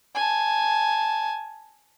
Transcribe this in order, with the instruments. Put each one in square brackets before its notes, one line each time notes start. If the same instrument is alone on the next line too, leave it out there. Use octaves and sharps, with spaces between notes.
[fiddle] G#5 A5